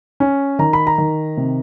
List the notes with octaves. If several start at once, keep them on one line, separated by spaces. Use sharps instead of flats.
C#4
D#3 A#5
B5
A#5
D#3
C3